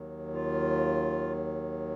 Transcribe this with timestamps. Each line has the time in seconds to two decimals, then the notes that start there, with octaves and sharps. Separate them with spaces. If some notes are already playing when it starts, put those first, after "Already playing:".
Already playing: D#2 D#3 F#3
0.33 F4